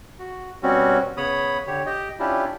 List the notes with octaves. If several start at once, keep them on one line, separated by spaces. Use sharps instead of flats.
F#4
B2 G3 C4 C#4 F#4
C#3 B3 C#5 B5 D#6
D3 G4 C#5
G4 D#5 G5
C#4 D4 E4 F4 G4